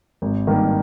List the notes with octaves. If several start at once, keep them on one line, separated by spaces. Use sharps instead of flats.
G#1
G2 D#3 A#3